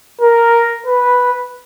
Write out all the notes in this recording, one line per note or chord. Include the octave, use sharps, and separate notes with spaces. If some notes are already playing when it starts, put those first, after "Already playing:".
A#4
B4